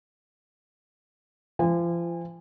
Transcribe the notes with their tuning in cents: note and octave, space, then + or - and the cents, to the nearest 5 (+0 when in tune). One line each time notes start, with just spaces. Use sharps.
F3 -35 G#5 -35